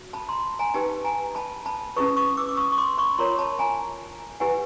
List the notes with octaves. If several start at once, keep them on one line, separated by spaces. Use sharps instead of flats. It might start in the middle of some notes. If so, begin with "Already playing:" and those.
Already playing: F#4
A5 B5
A#5 C6
G#5 A#5
D#4 G4 B4 G5 A5
G#5 A#5
A5 B5
A5 B5
C#4 E4 G#4 B4 C#6 D#6
C#6 D#6
D6 E6
D6
C#6 D#6
C#6
C6 D6
B5 C#6
F4 A#4 C#5 A#5 C6
A5 B5
G#5 A#5
E4 G4 B4 F#5 G#5